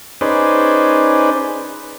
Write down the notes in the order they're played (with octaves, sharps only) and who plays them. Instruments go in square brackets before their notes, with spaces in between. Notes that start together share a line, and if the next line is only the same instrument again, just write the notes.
[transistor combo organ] C#4 D#4 G#4 B4 C5 D5